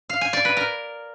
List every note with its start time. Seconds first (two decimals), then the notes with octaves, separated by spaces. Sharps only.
0.10 F5
0.21 G#5
0.33 D5
0.45 B4
0.57 A#4